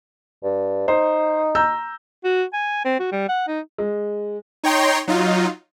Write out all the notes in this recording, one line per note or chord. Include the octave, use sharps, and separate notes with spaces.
G2
D#4 C5
A#5 E6 G6
F#4
G#5
C4
F#4
G3
F#5
D#4
G#3
D#4 C#5 G5 A#5 C6
F#3 D#4 F4